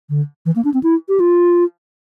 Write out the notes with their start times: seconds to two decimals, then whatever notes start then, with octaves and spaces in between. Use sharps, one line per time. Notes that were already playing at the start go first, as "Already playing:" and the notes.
0.10 D3
0.46 E3
0.56 A#3
0.65 D4
0.74 C4
0.83 E4
1.09 G4
1.20 F4